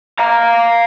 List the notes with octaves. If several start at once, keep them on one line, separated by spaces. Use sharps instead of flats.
F5 A#5